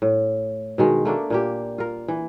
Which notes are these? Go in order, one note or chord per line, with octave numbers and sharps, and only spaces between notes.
A2
B2 D#3 G#3
A3 A#3 D4 A4
A#2 A#3 G4
F4 A#4
E3